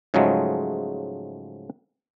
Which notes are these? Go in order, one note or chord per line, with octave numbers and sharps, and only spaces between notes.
G#2 C#3 F3 F#3 G#3 A3